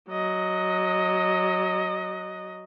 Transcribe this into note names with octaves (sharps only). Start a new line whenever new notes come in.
F#3 D#5